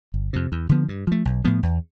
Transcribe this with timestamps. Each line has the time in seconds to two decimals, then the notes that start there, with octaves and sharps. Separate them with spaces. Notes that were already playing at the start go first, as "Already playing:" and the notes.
0.14 G1
0.33 F2 C3
0.52 E2
0.69 D3 F3 B3
0.89 G2
1.07 F3 A3
1.25 B1
1.45 A2 F3 B3
1.63 E2